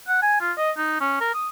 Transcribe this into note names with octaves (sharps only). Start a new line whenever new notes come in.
F#5
G#5
F4
D#5
D#4
C#4
A#4
D#6